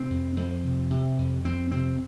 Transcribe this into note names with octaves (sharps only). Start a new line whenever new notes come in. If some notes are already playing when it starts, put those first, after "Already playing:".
Already playing: C3 C4
F2
F2 C4
C3
C3
F2
F2 C4
C3 C4